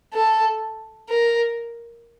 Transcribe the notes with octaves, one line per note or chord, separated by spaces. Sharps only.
A4
A#4